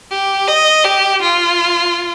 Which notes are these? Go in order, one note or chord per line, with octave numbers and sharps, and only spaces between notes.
G4
D#5
G4
F4